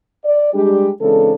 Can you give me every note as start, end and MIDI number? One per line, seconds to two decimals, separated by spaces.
0.25 0.51 74
0.54 0.91 55
0.54 0.91 56
0.54 0.91 62
0.54 0.91 67
1.01 1.33 49
1.01 1.33 52
1.01 1.33 56
1.01 1.33 60
1.01 1.33 62
1.01 1.33 69